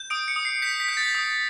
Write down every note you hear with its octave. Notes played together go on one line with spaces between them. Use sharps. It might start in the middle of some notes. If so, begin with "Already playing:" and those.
Already playing: G6
D#6 D7
C#7
D#6
C7
G6 B6
B6
G6
A6
D#6